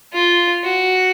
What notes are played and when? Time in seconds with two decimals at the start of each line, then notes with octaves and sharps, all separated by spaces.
0.13 F4
0.64 F#4